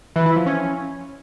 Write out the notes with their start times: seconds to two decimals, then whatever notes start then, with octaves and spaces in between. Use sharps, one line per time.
0.16 E3
0.26 E4
0.36 F3
0.46 C#4